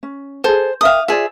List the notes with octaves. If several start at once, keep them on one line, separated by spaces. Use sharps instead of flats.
C#4
G#4 A4 C5
A#4 E5 F5 G5 D#6
F4 G#4 C5 D5 E5